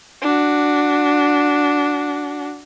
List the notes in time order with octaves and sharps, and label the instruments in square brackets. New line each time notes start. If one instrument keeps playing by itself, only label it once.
[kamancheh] D4 F#4